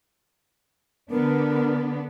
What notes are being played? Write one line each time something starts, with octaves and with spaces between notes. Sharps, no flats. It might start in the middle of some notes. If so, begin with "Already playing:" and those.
D3 B3 D4 A#4